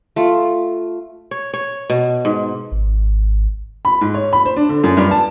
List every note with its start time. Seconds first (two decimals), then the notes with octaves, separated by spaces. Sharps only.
0.16 A3 F4
1.31 C#5
1.54 C#5
1.90 B2
2.25 G#2
2.72 G#1
3.85 B5
4.01 G#2
4.14 C#5
4.33 B5
4.45 C5
4.56 D4
4.69 D3
4.84 F#2
4.97 G2
5.11 A5